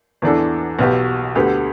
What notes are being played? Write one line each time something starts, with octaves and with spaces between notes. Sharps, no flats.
E2 E3 B3 D4 A4
B1 B2 B3 G4
D2 D3 B3 G4